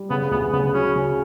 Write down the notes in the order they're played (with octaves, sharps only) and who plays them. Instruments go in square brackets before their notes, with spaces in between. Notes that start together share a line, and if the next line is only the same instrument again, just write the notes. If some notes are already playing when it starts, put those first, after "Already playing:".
Already playing: [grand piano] G3
[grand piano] C#3 [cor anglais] B3
[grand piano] D2 [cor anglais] B3
[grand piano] C#3 [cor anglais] B3
[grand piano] F#3 [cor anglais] C#4
[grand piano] C#3